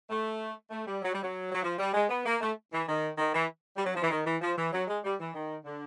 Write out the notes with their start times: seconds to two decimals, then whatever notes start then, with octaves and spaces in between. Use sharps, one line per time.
0.09 A3
0.70 A3
0.86 G3
1.01 F#3
1.11 G3
1.22 F#3
1.52 F#3
1.63 F3
1.78 G3
1.93 G#3
2.09 B3
2.25 A#3
2.40 A3
2.71 E3
2.86 D#3
3.17 D#3
3.33 E3
3.76 G3
3.84 F#3
3.94 F3
4.02 E3
4.10 D#3
4.25 E3
4.41 F3
4.57 E3
4.72 F#3
4.87 G#3
5.03 G3
5.18 E3
5.34 D#3
5.64 D3